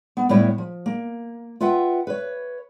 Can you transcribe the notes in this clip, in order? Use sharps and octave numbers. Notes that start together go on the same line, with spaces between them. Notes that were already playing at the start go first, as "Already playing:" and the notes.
B3
A2 G3 B3 E4 C#5 E5
F3
A#3
F4 B4 E5 F#5 G5
B4 C#5